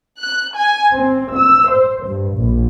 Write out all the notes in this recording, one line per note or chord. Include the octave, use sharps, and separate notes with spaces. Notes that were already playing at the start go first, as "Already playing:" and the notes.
F#6
G#5
C4
E6
C5
G2
A#1